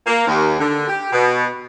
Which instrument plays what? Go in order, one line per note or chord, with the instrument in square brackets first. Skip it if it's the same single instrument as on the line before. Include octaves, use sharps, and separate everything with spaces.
[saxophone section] A#3
D#2
D3
G4
B2